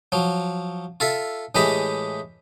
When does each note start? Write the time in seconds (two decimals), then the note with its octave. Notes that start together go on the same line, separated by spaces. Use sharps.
0.12 F3 F#3
1.00 F4 A4 E5
1.55 A2 E3 G#3 G4 D#5 B5